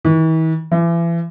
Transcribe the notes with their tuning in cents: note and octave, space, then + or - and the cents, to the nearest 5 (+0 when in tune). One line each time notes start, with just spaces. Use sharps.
E3 -45
E3 +35